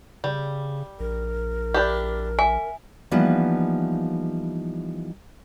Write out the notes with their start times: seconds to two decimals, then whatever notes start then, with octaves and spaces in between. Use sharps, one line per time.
0.24 C#3 G3
1.00 A#1 A#4
1.74 D4 E4 G4
2.39 E5 G#5
3.11 E3 F3 G3 A#3 B3 D#4